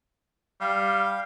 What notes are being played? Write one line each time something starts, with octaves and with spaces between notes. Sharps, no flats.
G3 F5